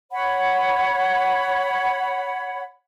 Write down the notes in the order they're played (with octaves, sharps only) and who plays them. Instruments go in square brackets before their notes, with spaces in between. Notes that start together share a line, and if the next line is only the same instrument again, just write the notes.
[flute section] C#5 F#5 B5